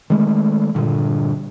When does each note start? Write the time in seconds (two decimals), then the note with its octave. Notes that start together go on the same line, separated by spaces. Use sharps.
0.10 D#3 G#3 A3
0.75 G2 A#2 D3